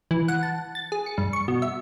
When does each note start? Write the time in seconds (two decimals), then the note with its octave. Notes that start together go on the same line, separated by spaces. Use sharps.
0.11 E3
0.28 F#5
0.43 A5
0.75 A6
0.92 G#4
1.06 C#7
1.18 G2
1.33 C#6
1.48 B2
1.62 E5